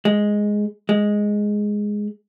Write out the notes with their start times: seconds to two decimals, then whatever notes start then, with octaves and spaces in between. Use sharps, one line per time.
0.05 G#3
0.89 G#3